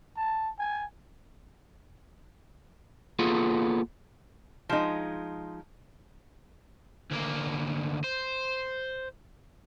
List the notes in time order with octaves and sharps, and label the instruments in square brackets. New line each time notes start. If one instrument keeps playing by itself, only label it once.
[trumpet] A5
G#5
[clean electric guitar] A#3 B3 F4 G#4 A4
[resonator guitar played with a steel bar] F3 G#3 D#4
[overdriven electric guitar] D2 A#3
C5